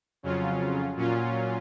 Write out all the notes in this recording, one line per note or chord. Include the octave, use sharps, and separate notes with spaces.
F2 C#3 F#3 C#4 F4
A#2 F#3 C#4 F4